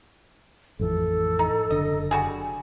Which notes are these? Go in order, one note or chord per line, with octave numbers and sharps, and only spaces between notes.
A1 F2 E3 A4
D#4
F#1 D3 D#5
G3 F#4 G#4